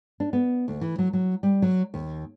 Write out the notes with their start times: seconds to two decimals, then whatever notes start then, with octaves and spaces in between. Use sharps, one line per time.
0.20 D4
0.33 B3
0.68 D2
0.81 E3
0.98 F#3
1.13 F#3
1.43 G3
1.62 F#3
1.94 D#2